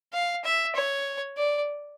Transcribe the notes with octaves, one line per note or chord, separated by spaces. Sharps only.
F5
E5
C#5
D5